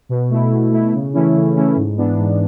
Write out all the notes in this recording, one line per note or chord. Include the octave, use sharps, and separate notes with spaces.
B2
A3 E4
B2
A3 E4
C#3
E3 A3 C#4 E4
C#3
E3 A3 C#4 E4
G#2
E3 B3 D4
G#2